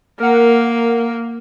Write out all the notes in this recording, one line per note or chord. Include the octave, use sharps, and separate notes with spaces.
A#3 A#4 F#5